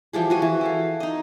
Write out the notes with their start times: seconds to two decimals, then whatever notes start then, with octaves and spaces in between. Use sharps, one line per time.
0.13 E3 F3 G3 G#4
0.30 F4 F#4 G#5
0.42 E3
0.61 E4 A4 F5
1.00 D#4 D#5